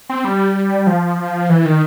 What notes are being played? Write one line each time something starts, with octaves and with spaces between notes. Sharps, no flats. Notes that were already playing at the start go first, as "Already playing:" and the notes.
C4
G3
F3
E3
D#3